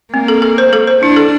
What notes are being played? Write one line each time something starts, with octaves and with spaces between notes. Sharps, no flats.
A#3 C4
A4
A4
C5
A4
C5
D4 E4
A4